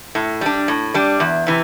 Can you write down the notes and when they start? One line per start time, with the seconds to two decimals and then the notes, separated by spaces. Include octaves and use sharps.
0.15 A2
0.41 G3 D4
0.68 A2
0.94 G3 D4
1.20 E2
1.47 C3 E3